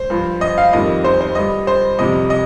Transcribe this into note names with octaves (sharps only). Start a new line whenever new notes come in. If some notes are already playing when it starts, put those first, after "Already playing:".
Already playing: C5
G2 F3
D#5
F5
F2 D#3 G3 D#5
C5
C5
G2 G3 D#5
C5
F2 C3 G3 D#5
D#5